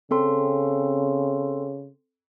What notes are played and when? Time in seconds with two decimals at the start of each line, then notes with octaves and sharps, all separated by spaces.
0.11 C#3 C4 A4 C6